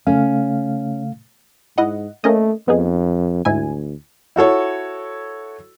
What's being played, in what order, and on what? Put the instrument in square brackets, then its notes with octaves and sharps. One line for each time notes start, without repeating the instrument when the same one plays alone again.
[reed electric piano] C#3 A3 F5 [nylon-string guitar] C#4
[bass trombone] G#2 [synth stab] E4 D#5 F#5
[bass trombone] A3 [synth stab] A#3 C#4 D#5
[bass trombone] F2 [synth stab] B3 D#4 G#4
[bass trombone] D2 [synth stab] G#2 E4 G#5
[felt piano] E4 F#4 A4 C#5